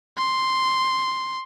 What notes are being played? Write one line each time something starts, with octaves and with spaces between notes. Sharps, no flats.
C6